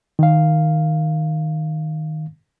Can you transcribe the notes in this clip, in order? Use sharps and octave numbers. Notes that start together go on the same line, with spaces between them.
D#3 F5